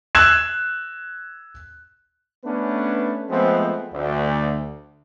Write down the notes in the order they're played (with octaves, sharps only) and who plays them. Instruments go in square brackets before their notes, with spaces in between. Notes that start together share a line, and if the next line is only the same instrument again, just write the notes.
[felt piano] E6 F#6 G#6 E7
[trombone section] A3 B3 C#4 D4 B4
F3 G#3 A3 B3 C4
D2